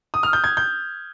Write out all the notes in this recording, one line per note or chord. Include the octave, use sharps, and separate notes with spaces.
D#6
F6
G6
G#6
G6